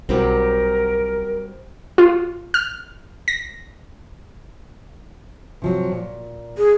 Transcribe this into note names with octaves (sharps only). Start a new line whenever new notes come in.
B1 F#3 G3 C4 A#4
F4
F6
A#6
C3 F3 F#3
A#2
G#4